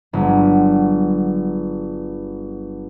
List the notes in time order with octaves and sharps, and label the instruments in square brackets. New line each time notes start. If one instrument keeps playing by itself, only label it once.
[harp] G1 F#3 G#3